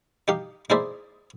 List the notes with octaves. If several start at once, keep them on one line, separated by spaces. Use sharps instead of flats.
D#4 G4 F5
D#4 E4 G#4 C5 D5 E5